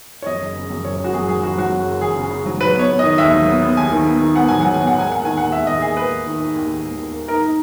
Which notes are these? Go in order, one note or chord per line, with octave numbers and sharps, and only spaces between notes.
C#5
F#2 D#5
F#1
C#3
F#2
F#1 C#5
F#1 F#4
F#2 G#4
F#3 G#4
F#1 F#4
F#3 F#4
F#2
F#1
F#1 G#4
C#3
C#3
F#3
F#3 B4
B3 C#5
B3
D#3 D#5
D#2 E5
F#3
B3
B3
D#2 G#5
D#3
B3
D#3
B3 F#5
F#3 G#5
F#3 F#5
G#5
B3
F#5
E1
G#5
A#3 F#5
D#3 G#5
D#2 F#5
E1 E5
D#2 D#5
A#3 G#4
A#3 B4
A#3
D#3
D#3
D#2
D#2
E1
D#2
A#3
D#4 A#4
D#4